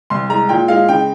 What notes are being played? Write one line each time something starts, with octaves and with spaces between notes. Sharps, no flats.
C2 C6
G#3 A#5
A#2 G5
G#3 F5
C#3 G5